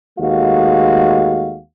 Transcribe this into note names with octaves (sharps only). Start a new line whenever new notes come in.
D#2 G#3 A3 F#4 F5